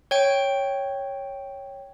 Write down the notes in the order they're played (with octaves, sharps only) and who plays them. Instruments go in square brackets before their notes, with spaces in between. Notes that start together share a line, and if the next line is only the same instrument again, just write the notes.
[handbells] C#5 G5 D7